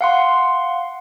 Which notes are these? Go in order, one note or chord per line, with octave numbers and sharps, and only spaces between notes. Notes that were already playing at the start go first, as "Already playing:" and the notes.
F5 F#5 C6